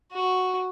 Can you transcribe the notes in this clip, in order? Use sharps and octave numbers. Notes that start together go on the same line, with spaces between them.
F#4